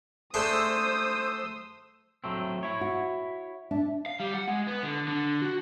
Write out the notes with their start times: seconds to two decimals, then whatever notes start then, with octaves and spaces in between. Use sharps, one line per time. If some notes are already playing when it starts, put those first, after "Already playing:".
0.34 A3 D4 G#4 C5 C6 D#6 E6
2.24 F#3 A3 C4
2.63 E4 C#5
2.81 F#4
3.71 D4 E5
4.06 F5
4.20 G3
4.34 F#5
4.48 G#3
4.67 B3
4.83 D3
5.08 D3
5.42 F#4